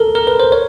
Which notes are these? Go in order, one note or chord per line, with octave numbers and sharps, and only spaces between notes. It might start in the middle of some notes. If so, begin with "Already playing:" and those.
Already playing: A4 A#4
A#4
B4
C5
C#5